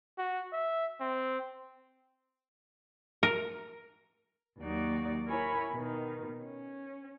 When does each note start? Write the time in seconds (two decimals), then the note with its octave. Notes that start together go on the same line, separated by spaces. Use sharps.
0.18 F#4
0.53 E5
1.01 C4
3.23 A#4
4.60 D#2 F#3 A#3 D#4 F#4 D5
5.26 E4 A#4 C#5 G#5 B5
5.72 B2 D#3
6.42 C#4